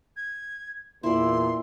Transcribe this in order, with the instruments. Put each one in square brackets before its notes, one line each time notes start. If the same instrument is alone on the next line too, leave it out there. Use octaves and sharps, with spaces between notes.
[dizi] G#6
[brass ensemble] E2 A#2 [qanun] E4 D5 [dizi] C6